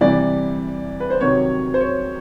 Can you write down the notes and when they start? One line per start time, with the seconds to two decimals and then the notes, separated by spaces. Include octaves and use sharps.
0.01 C3 E3 G3 D5
1.00 B4
1.10 C5
1.21 C3 D#3 F#3 C#5
1.74 C5
1.81 C#5